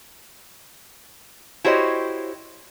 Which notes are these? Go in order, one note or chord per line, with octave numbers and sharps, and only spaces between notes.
E4 F#4 G4 C5 C#5 D#5